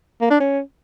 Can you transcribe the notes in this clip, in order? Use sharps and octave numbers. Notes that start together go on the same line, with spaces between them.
A#3
D4
C#4